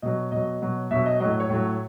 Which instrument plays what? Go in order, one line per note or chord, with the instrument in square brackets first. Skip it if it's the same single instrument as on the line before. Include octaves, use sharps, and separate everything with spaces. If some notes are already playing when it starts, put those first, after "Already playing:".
[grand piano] B2 F#3 D#5
B2 F#3 D#5
B2 F#3
B2 F#3 E5
D#5
A2 F#3 D#5
C#5
A2 F#3